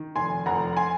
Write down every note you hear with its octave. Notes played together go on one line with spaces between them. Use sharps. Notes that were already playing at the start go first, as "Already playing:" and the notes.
Already playing: D#3
F1 G#5 C6
F1 F#5 A#5
G#5 C6